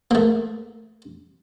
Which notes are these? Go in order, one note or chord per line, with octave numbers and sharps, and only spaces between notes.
A3 A#3